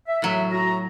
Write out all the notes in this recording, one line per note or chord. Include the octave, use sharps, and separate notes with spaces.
E5
A2 F#3
F#4 A#5